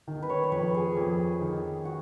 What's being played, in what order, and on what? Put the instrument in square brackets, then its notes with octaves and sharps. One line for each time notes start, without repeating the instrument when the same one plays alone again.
[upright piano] D#3
[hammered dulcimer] B4
C#5
C#5
[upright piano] F2 [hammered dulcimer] B4
[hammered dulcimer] G#4
[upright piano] F2
D#3
[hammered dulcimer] F#4